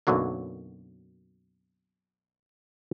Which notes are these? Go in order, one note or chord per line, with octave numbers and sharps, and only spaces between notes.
B1 F#2 D3 F#3 A#3